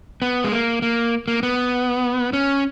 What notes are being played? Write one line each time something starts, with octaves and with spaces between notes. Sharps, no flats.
B3
G#3
A#3
A#3
A#3
B3
C#4